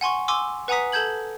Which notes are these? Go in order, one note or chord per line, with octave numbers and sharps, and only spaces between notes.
F#5 G#5 C6 C#6
G#5 C6 D6 E6
B4 F#5 G#5 A#5 D#6 B6
A4 A5 G6 G#6 F#7